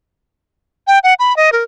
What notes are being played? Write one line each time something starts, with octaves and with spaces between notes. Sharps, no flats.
G5
F#5
B5
D#5
A#4